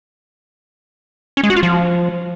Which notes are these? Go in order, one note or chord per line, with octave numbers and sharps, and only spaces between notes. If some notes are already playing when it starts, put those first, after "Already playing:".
C#4
G#3
F#4
F4
F3